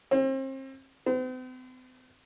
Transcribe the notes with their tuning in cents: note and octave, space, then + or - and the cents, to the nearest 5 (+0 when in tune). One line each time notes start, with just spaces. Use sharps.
C4 +35
C4 -45